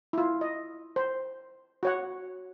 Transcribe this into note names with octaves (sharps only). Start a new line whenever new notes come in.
E4 F4
D#5
C5
F#4 C#5 F#5